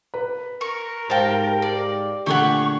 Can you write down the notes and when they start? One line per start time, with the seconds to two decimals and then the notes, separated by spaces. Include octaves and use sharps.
0.14 B4
0.61 A#4 C#6
1.10 G#2 G4 C5 F5 G5 A5
1.62 D5
2.26 A#2 D3 A3 G4 G#4 F#5 C#6